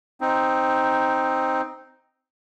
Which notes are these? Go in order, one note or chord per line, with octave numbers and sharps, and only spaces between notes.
C4 D#4